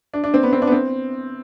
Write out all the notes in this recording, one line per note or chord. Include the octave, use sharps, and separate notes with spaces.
D4
D4
C4
B3
C4
D4
B3
C4